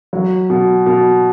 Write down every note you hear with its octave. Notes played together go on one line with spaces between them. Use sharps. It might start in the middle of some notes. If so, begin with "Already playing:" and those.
F#3
B2
B2